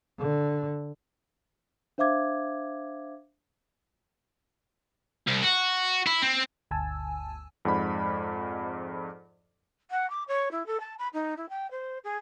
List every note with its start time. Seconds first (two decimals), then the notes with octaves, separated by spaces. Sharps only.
0.19 D3
1.98 D4 C5 E5 F5 D6 G#6
5.28 C2
5.43 F#4
6.07 E4
6.22 C4
6.71 G1 D2 G#5 A5 E6
7.65 F2 G#2 D5 B5
9.91 F#5
10.10 D6
10.28 C#5
10.52 E4
10.66 A4
10.80 A5
10.99 B5
11.13 D#4
11.37 E4
11.49 G5
11.71 C5
12.04 G#4